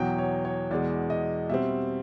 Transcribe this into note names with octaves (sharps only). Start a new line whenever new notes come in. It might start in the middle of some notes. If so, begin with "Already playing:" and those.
Already playing: E2 B2 F#3 G5
C#5
C#5
E2 B2 G#3 D5
D#5
B2 G3 C4 E5